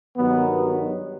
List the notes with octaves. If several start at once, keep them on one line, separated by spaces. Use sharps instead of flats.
G2 D#3 F#3 B3